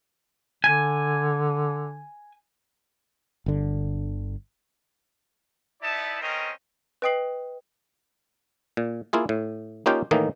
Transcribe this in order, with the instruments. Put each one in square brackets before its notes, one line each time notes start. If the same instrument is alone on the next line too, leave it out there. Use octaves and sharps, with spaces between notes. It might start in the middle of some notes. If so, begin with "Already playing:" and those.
[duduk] D3 [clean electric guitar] G#5
[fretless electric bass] G1 D3
[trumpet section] B3 D#4 E4 D5 E5 A5
A3 C4 C#4 A#4 D#5 G5
[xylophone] B4 D#5 G5 D#6 C7 F#7
[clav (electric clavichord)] A#2
A#3 E4 F4 G#4
A2
A#3 C#4 D#4 F4 G4 G5
A2 D#3 E3 A#3 D#4